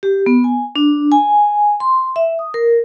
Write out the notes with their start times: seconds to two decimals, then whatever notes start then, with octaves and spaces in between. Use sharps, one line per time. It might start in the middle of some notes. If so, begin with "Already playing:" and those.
0.03 G4
0.26 B3
0.44 G#5
0.76 D4
1.12 G#5
1.80 C6
2.16 E5
2.39 D#6
2.54 A#4